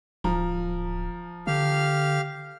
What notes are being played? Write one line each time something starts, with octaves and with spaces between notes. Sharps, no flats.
D1 F3 A#5
D3 G4 F5 F6